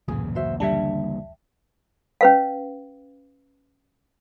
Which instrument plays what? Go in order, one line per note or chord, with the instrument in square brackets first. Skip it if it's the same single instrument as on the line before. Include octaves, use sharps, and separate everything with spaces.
[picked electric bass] D1 A1 F#2 [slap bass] A#2 C#3 E3 [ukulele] G#4
[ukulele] F#4 C5 E5
[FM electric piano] D3 G3 D4 [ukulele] E5 G5 A5
[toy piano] C#4 B4 F5